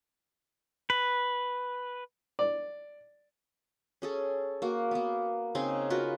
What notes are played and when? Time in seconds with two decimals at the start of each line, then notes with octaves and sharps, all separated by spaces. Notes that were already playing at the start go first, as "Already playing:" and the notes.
0.90 B4
2.39 D5
4.02 C#4 G#4 A4
4.62 A#3 F#4
4.91 A#3 B3
5.55 C#3 C4 D#4 G#4
5.90 F4 F#4 A#4 B4